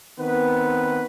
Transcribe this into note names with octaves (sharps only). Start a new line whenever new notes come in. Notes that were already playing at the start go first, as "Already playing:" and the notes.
D#3 B3 C4 B4